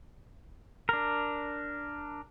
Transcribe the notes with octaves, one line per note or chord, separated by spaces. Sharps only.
D4 A#4